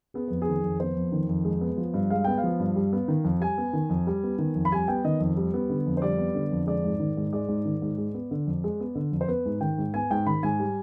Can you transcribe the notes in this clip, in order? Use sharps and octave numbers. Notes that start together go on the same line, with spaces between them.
B3 G#4
F2 B4
G#4
D#3
F2
B3 C5
F2
D#3
F2
G#3
B3
F3
G2
G#3 F5
B3 G5
F5
F3
G2
G3
B3
D#3
F2
G3 G#5
B3
D#3
F2
G3
B3
D#3
F2
B5
G3 G#5
B3 G5
D#3 D#5
F2
G3
B3
D3
F2
C5
G3 D5
B3
D3
F2
G#3 D5
G#2
D#3
G#2
G#3 D5
G#2
D#3
G#2
G#3
B3
D3
F2
G#3
B3
D3
F2
C5
B3 B4
G#2
D#3 G5
G#2
B3 G#5
G#2 G5
D#3 B5
G#2 G#5
G3